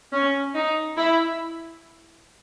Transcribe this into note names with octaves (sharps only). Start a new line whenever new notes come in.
C#4
D#4
E4